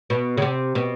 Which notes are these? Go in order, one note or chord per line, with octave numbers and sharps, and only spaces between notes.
B2
C#3
C3
B2